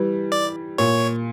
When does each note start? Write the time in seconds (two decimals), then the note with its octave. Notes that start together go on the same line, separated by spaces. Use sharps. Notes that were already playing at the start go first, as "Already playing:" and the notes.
Already playing: E3 G3
0.32 D5
0.78 A#2 C#5